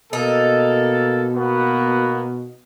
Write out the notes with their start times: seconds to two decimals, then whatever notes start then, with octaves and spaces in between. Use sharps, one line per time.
0.13 B2 A#3 D#4 A4
1.35 A#3 B3 F#4